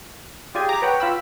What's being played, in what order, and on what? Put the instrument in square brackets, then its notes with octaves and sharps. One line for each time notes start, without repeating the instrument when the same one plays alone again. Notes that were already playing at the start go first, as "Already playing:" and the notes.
[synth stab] F4 D5 G#5 [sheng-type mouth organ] G4 G#4
[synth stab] A#5 [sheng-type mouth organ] D6
[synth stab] B4 C#5 F#5 [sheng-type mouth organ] G5
[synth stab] F4 B5 E6